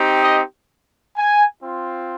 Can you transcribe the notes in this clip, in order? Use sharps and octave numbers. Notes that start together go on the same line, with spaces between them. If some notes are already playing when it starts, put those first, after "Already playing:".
Already playing: C4 D#4 G4
D#5
G#5
C4 F4